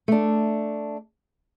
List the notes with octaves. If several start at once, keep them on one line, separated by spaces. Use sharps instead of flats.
A3 D4